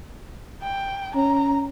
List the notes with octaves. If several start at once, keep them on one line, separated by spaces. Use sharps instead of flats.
G5
C#4 A#5